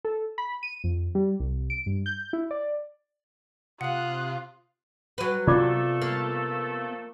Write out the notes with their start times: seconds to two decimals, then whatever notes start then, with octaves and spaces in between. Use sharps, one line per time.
0.05 A4
0.38 B5
0.63 D#7
0.84 F2
1.15 G3
1.40 C2
1.70 D7
1.86 G2
2.06 G6
2.33 E4
2.51 D5
3.81 C3 F4 F5 F#5 D#6 F#6
5.18 F#3 B4
5.47 C3 F3 A3 B3 F4 A4 D5 D6
6.02 A#3